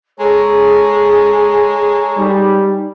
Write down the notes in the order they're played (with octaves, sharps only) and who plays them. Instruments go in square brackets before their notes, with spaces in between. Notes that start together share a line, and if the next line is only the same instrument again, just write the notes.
[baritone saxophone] G#3 [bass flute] G#4 [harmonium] A4 C#5 A#5
[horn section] G3 [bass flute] D#4